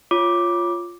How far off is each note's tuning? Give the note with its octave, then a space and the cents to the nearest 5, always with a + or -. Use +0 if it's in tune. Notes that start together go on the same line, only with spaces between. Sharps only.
F4 +0 C#5 +0 D6 +0